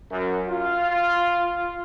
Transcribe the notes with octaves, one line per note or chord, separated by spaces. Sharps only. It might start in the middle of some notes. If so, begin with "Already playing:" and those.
F#2
F4